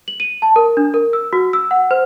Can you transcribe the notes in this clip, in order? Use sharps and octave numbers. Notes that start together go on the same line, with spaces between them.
F#7
D#7
A5
A#4
D4
A#4
E6
F#4
E6
F#5
C5